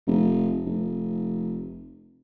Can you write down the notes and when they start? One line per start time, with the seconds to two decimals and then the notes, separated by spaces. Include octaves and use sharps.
0.07 F1
0.66 F1